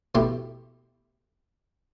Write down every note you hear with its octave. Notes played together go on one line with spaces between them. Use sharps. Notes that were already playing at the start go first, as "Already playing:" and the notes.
B2 A3 E4 G4